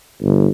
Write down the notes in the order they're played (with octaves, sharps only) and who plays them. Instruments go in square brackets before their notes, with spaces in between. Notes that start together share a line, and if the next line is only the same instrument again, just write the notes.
[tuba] G1